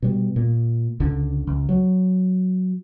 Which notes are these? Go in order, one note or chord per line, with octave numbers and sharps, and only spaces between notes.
B2 G3
A#2
C#2 D3
C#2
F#3